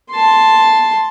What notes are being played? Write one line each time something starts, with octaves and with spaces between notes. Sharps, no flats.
A5 C6